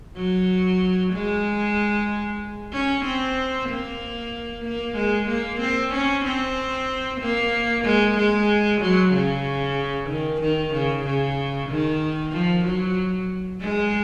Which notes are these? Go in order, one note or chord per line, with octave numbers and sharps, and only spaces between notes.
F#3
G#3
C#4
C4
A#3
A#3
G#3
A#3
C4
C#4
C4
A#3
G#3
G#3
F#3
C#3
D#3
D#3
C#3
C#3
D#3
F3
F#3
G#3